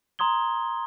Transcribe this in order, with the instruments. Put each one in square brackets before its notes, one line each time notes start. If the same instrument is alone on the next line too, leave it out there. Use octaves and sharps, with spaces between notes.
[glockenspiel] A#5 C6 D#6 G#6 G7